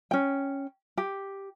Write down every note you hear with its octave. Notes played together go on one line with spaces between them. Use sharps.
C#4 G5
G4